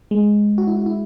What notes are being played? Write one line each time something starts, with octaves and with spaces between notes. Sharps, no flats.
G#3
F#4
E4
F#4
E4